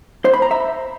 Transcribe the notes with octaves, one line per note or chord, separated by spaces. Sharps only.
C5
B5
A#5
E5